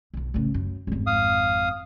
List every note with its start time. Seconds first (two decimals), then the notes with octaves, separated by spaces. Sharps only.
0.14 B1 F2
0.34 A2 C#3
0.54 F#2
0.87 G#1 F2
1.07 F5 D#6